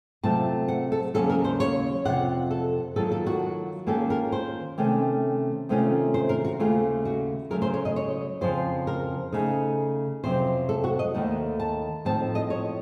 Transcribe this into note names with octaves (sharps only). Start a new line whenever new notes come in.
C3 F#3 A3 C4 F4 A5
F#5
A4
D#2 C#3 F#3 A#3 C#4 A4
A#4
C5
C#5
F2 C3 F4 F#5
A4
D#3 F#3 A#3 F4 A4
A4
F#4
D#3 A#3 C#4 F4 A4
A#4
C5
C3 D#3 A3 C#4
C3 D#3 A3 C#4 F4
C5
A#4
F#4
D#2 C#3 A3 F4
F#4
C#3 F#3 A3 A#4
C5
C#5
D#5
C#5
F2 C#3 F3 C5
A#4
C#3 A3 D#4
F2 C3 F#3 C5
A4
F#4
D#5
D#2 D#3 A3 D#4 F#5
A5
A2 F3 C4 D#4 A5
D#5
C#5